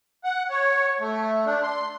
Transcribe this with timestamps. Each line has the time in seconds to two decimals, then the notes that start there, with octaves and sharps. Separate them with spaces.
0.24 F#5
0.50 C#5
1.00 A3
1.45 D4
1.63 C6